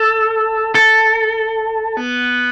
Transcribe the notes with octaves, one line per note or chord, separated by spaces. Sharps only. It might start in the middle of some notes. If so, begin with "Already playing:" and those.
Already playing: A4
A4
B3